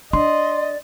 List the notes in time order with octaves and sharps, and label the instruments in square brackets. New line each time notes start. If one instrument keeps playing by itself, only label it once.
[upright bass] D4 [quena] D5 [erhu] D#5 [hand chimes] C6